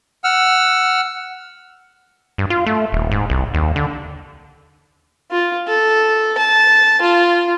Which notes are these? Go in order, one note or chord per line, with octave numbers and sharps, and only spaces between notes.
F#5 E6 F6
G2
F4
A3
D#1
G#2
C2
D#2
D3
F4
A4
A5
F4